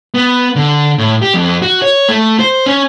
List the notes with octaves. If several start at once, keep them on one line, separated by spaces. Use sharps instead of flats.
B3
D3
A2
G4
F2
F#4
C#5
A3
C5
C#4